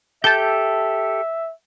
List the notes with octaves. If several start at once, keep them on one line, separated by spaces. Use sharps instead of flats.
G4 A4 E5 A5 G6